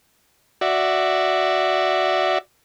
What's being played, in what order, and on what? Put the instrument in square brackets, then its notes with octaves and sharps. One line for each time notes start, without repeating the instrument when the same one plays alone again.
[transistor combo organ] F#4 D5 E5